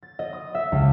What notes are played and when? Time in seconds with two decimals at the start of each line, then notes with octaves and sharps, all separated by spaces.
0.03 A6
0.19 D#5
0.33 D#6
0.55 E5
0.72 C#2